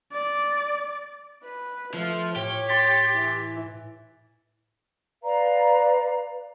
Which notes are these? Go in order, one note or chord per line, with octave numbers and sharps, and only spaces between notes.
D5
B4
F3 A3
A2 G4 C#5
C6 A6 B6
E3
B4 D5 F5 A#5